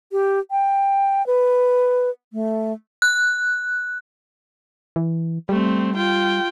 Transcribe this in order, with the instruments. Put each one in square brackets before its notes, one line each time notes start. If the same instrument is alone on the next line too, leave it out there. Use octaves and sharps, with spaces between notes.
[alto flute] G4
G5
B4
A3
[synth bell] F#6
[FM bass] E3
[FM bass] G3 [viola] A3 C4
[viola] F4 G5